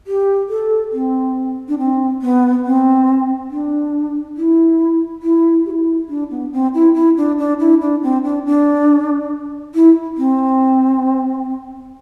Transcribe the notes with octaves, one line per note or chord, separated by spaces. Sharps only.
G4
A4
C4
D4
C4
B3
C4
D4
E4
E4
G4
E4
D4
B3
C4
E4
E4
D4
D4
E4
D4
C4
D4
D4
E4
C4